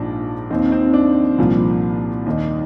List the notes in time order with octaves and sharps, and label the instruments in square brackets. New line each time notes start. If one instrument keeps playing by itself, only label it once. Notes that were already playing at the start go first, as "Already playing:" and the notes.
Already playing: [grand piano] A#1 G#2 F3 D4
D#2 D#3 C4
C4
D4
C2 A#2 F3
D#2 D#3